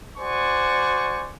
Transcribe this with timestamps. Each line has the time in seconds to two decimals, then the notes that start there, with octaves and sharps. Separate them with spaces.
0.17 F#4 C5 D5 G#5 C#6